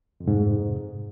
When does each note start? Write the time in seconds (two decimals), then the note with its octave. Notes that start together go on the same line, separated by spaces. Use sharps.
0.20 F2
0.24 C3
0.27 G#2